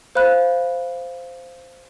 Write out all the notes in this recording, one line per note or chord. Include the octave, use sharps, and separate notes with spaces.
C5 F5 B5 F#6